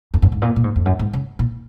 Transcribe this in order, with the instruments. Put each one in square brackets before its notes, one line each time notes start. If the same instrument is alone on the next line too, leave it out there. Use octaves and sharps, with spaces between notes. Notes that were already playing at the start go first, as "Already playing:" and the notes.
[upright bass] F2
F#2
G#2
A#2
A#2
G#2
F2
F#2
G#2
C#3
A#2